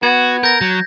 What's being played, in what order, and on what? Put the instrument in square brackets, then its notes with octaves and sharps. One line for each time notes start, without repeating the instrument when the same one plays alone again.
[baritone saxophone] B3 [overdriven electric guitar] F#4 [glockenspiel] G#6
[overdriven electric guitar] A#4 [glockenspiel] G6 A#6
[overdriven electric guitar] F#3